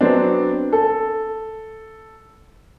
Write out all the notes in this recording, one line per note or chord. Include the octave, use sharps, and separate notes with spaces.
F#3 B3 C4 D4
A4